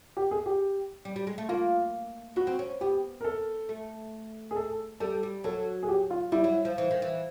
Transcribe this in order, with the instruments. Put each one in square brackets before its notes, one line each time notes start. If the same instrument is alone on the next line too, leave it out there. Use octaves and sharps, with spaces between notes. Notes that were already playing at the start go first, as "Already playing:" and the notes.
[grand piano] G4
G#4
G4
[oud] G3
G3
G#3
A3
[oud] A#3 [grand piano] F4
[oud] B3 [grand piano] F#4
[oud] C4
C#4
[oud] B3 [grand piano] G4
[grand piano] A#4
A4
[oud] A3
[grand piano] G#4
A4
[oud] G3 [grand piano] A4
[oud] G3
[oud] F#3 [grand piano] A4
[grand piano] G#4
G4
F4
[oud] G3 [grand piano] E4
[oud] F#3
F3
E3
D#3
E3